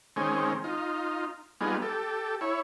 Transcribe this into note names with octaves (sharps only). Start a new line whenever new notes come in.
D#3 G#3 C4 C#4
D#4 F4
G3 B3 D#4 F4 G#4
G4 A4
E4 C#5